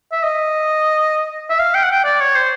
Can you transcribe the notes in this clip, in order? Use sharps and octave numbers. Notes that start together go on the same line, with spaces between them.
E5
D#5
E5
F5
G5
F#5
G5
D5
C#5
C5